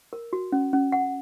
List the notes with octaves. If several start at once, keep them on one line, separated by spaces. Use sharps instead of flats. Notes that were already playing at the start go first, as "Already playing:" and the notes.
A#4
F#4
C#4
C#4
F#5